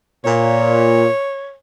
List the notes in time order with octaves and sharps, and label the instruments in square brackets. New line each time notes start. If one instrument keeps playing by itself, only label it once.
[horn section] A#2 [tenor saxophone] C#5